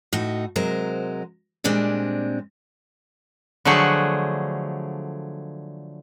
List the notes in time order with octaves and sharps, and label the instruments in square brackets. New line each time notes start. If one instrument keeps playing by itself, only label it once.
[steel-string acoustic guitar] A2 D#4 F#4
C3 F#3 G#3 A#4 C5
A#2 G3 G#3 C4 D4
[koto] D3 F3 F#3 A3 G#4 F#5